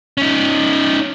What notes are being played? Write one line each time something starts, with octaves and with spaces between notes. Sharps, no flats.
C#4 D#4